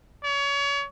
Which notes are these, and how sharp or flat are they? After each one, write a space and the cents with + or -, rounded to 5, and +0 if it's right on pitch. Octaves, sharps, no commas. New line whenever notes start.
C#5 +30